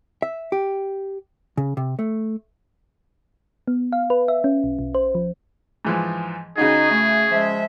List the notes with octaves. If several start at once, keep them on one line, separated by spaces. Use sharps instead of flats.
E5
G4
C#3
C3
A3
B3
F5
B4
E5
C#4
B1
B1
C5
F3
G#2 E3 F3
C#3 D#4 F#4 G#4 D#5
A3
F3 G#3 E5